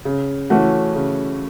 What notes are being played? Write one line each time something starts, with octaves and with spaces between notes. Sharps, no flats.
C#3
E3 A3 C#4 F#4
C#3